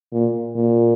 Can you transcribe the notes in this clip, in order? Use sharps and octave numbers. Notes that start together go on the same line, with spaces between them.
A#2
A#2